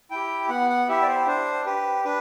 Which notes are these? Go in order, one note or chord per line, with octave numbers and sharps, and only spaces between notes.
E4 G4 G5
B3 F#5
F#5
E4 G4 E5
D5
C5
D4 C5
G4 B4
D4 B4